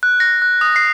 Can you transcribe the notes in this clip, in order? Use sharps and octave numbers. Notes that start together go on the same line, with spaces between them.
F#6
A#6
F#6
D#6
C7